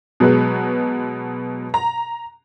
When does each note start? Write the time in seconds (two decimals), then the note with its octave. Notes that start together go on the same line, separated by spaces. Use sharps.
0.20 B2 F#3 G#3 B3
1.74 A#5